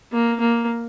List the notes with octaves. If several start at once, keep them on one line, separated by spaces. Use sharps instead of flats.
A#3
A#3